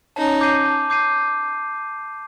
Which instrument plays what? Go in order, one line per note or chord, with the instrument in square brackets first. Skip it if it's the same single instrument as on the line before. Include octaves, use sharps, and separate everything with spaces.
[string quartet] C#4 D#4 [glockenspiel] A5
[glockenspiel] D6 G6 C7 D#7
A5
D6 G6 C7 D#7